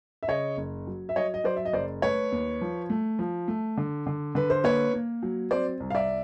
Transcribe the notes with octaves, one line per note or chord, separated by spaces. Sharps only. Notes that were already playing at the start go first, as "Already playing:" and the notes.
E5
C#3 C#5 D#5
F#1
F#3
E5
F#3 C#5 D#5
D#5
F#3 C5 D5
E5
D#5
F#1 C5 D5
A3 B4 C#5
D#2
F3
A3
F3
A3
D3
D3
D3 B4
C5
A#3 B4 C#5
A#3
F#3
C4 C5 D5
C2
F5
D5 E5